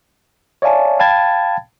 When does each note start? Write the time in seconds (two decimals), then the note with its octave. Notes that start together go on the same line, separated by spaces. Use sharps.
0.62 C#5 D5 E5 F5 G#5 A5
0.99 F5 G5 A5 B5 G#6 A6